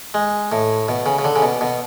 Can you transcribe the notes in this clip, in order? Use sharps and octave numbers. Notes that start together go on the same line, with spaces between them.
G#3
A2
B2
C#3
C#3
D3
C#3
B2
B2